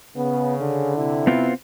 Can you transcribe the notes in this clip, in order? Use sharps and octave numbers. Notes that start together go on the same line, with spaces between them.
C#3 B3
D3
C3 E4
B3 C4 F4